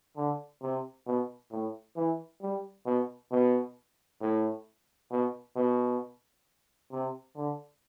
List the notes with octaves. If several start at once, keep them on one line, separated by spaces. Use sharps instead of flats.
D3
C3
B2
A2
E3
G3
B2
B2
A2
B2
B2
C3
D3